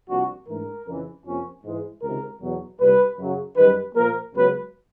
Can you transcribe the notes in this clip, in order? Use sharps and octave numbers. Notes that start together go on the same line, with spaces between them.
C2 C3 F3 A#3 D4 F#4
G#2 E3 A3 D4 A#4
F2 C#3 E3
F2 C3 F3 A#3 C#4
G#2 E3 G#3
C#2 C3 D#3 A#4
E2 B2 F#3
C2 A#2 G3 B4
F#2 C#3 F#3
F#2 D#3 G3 B4
A#2 F3 A#3 A#4
C#2 C#3 F#3 B3 B4